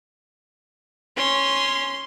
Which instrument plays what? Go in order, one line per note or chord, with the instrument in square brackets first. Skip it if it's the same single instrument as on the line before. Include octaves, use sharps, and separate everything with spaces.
[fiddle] C#4 [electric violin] C6